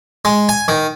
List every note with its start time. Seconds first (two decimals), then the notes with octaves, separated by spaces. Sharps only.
0.25 G#3
0.49 G#5
0.68 D#3